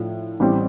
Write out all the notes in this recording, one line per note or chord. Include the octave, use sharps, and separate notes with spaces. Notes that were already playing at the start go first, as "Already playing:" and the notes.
Already playing: A2 F3 A3 D4
A1 A2 G3 C4 G4